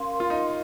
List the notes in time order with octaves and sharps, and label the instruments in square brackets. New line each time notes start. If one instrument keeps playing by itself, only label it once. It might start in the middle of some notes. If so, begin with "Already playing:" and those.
Already playing: [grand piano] C#4 [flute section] A#4 F5 C6
[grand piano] F4
D#4